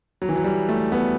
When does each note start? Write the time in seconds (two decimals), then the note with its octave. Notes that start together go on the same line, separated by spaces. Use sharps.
0.22 F#3
0.29 E3
0.36 F#3
0.44 G3
0.69 A3
0.92 B3